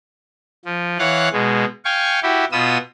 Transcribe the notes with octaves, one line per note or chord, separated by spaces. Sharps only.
F3
E3 C#5 F5 F#5 F#6
B2 G#3
F5 G5 G#5 C#6
E4 F#4 G4
B2 B3 F4 D#6 E6